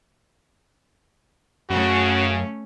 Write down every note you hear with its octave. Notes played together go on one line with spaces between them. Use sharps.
F#2 C#3 A3 C#4 F#4